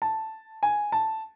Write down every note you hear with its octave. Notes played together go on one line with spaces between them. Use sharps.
A5
G#5
A5